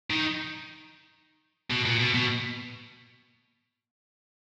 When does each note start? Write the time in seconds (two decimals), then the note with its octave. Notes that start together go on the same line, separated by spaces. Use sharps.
0.10 D#3
1.70 B2
1.85 A#2
2.00 B2
2.15 B2